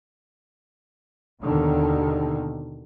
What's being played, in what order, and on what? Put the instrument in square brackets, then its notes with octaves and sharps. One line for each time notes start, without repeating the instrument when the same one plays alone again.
[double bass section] D#2 B2 D3 D#3